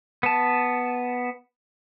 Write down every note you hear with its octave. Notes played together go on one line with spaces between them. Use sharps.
B3 A5